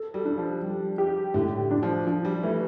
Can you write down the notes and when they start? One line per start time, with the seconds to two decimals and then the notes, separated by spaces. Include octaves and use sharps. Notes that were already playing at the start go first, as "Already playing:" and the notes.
Already playing: A4
0.14 G3
0.25 D4
0.37 F3
0.61 G3
0.98 G4
1.34 A2 D3
1.58 D3
1.71 D4
1.83 F3
2.07 F3 D4
2.25 G3
2.43 E3 A3